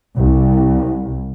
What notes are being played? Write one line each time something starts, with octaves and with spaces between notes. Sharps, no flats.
C2